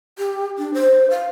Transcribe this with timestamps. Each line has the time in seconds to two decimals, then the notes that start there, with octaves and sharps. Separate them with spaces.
0.18 G4
0.58 D4
0.74 C5
1.10 F5